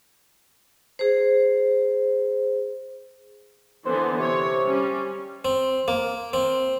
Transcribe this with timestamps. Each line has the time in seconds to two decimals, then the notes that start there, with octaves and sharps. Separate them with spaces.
0.99 G#4 C5
3.86 D3 E3 B3 C5
4.19 C3 C#5
4.67 G3 C#4
5.45 C4
5.88 A#3
6.33 C4